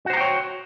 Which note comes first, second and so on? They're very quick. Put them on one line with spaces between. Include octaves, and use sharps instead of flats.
F#4 C5 A#5 G5 C#5